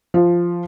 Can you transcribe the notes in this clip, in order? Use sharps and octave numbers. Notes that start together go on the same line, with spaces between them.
F3